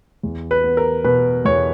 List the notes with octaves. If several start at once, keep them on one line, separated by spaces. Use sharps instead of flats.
E2
B4
B3
A#4
B2 B4
E2 C#5